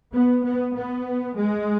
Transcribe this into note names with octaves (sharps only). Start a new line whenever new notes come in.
B3
B3
B3
G#3